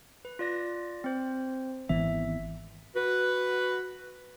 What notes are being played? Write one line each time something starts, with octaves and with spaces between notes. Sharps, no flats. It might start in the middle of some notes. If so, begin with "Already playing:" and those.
B4
F4 D5 A#6
C4 C5
G#1 E3 B3 E5
F#4 B4